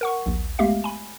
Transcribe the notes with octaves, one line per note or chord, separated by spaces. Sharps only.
A#4 F#5 C#6
A#1 D#2
G#3 A3 B3 G4 E5 F5
G#5 B5